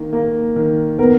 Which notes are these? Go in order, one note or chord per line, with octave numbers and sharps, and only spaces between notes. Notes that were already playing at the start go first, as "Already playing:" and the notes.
Already playing: D#3 A#3
A#3
D#3
B3 A#4